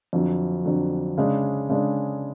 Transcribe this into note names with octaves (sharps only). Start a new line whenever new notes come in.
F2 D3 F#3
F2 D3 F#3
C#3 G#3 D4
C#3 G#3 D4